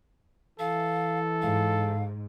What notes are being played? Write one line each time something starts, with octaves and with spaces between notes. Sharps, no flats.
E3 A4 F5
G#2 F5